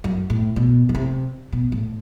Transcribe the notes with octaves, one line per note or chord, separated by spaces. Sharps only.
F#2
A2
B2
D#3
C3
B2
A2